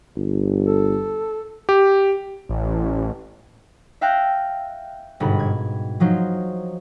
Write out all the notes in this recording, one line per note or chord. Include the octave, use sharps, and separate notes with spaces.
G1
A4
G4
A1
E5 F5 G5 F#6 G6 A#6
G1 G#2 B2 B5
G#6
F3 F#3 D#4 C5